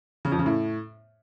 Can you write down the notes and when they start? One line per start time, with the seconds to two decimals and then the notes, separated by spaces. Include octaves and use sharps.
0.25 C#3
0.32 F2
0.39 C#3
0.46 A2